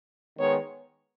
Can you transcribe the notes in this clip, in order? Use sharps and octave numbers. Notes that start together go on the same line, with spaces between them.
D#3 G#3 B3 C#5